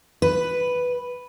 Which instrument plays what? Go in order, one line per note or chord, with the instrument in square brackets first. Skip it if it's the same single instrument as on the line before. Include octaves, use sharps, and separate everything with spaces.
[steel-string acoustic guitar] B4